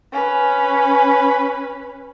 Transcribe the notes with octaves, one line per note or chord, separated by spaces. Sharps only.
C#4 B4